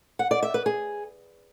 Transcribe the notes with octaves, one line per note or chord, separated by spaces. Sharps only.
F#5
D5
E5
B4
G#4